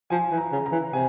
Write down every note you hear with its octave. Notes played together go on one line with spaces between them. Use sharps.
F3 G#5
E3
A#5
C#3
A#5
E3
C3 G#5